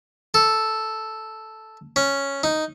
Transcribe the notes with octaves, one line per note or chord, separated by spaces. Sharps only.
A4
C#4
D#4